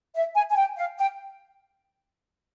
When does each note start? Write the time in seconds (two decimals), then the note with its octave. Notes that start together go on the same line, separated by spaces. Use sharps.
0.15 E5
0.35 G#5
0.50 G#5
0.57 G5
0.77 F5
0.98 G5